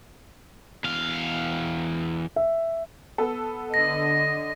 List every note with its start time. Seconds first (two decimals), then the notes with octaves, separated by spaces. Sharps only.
0.84 E2 F5
2.36 E5
3.18 B3 A4
3.74 D3 D#5 A#6